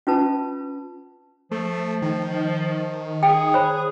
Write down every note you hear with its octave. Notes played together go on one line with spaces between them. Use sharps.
C#4 F4 B4 A5
F3 A3
D#3
G#4 G5
C5 C#5 B5